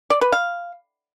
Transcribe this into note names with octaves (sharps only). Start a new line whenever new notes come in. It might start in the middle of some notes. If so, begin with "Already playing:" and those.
D5
B4
F5